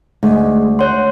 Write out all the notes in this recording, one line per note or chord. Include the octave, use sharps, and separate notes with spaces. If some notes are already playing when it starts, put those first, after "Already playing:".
D2 G#3
C#5 F#5 C6